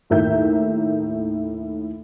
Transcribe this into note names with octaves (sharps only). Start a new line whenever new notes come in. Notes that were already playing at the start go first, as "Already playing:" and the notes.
D#2 A2 A#4 E5 G6